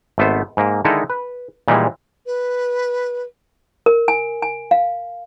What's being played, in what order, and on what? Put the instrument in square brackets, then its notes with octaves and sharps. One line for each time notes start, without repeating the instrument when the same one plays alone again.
[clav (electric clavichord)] G#1 A3 B3 C5
G#2 A#3
D3 D#3 G#3 D#4 E4 A4
B4
A#2 D#3 E3 G3 G#3
[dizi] B4
[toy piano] A#4
G#5
G#5
F5